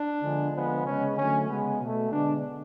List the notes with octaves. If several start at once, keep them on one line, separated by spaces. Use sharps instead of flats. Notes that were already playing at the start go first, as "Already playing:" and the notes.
Already playing: D4
D3 F3 G#3 B3
D3 F3 G#3 B3
C#3 G#3 B3 C#4
D3 F#3 A3 C#4
C#3 G#3 B3
B2 A3
D3 G#3 B3 D4